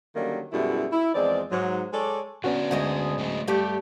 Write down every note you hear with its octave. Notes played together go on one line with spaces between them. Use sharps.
D3 D#3 F#3 G3 A#3 C#4
F#2 B2 G3 G#3 E4
E4
E2 F3 G#3 C4 D5
G#2 F#3
G#3 A4 C#5 D5
D3 B3 C#4 F#4 B4 D5
D2 G#3 D#5
D3 F#3 A3
G2 G3 A3 G4